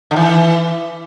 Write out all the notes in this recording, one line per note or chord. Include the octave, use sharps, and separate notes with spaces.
D3
E3